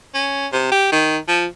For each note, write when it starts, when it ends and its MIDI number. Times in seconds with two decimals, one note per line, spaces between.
0.14 0.47 61
0.52 0.68 48
0.72 0.89 67
0.92 1.17 51
1.28 1.45 53